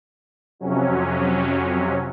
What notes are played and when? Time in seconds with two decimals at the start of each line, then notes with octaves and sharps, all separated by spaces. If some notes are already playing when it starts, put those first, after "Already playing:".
0.59 F2 C3 F#3 C#4